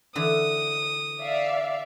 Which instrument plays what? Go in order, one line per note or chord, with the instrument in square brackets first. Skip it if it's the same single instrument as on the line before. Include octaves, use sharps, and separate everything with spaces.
[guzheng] D3 E3 [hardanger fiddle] D#6
[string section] D5 E5 F5